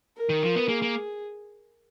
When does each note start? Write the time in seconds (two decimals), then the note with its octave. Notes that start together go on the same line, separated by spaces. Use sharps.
0.17 A#4
0.29 D#3
0.43 F3
0.56 B3
0.68 A#3 G#4
0.82 A#3